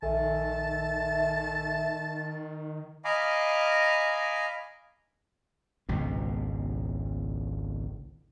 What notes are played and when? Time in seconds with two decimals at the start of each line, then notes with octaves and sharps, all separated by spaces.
0.02 A#1 D#3 A4 E5 G#5 A5
3.05 D#5 F5 G#5 A#5 B5 D6
5.89 G#1 C#2 B2